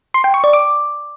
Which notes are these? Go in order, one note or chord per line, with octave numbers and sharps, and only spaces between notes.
C6
G5
C#6
D5
D6